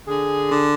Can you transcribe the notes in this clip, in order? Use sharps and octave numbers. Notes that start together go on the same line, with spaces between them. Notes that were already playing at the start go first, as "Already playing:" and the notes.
D3 G#4
D3